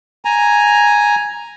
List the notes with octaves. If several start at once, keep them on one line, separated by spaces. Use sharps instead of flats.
G#5 A#5